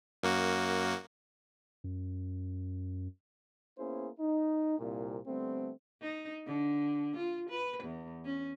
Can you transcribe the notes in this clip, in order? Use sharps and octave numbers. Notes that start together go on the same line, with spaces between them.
F#2 A#3 F#4
F#2
A#3 B3 C#4 E4 G#4 C5
D#4
C2 A#2
D3 G3 A3 B3 C4
D#4
D3
F4
B4
E2
C#4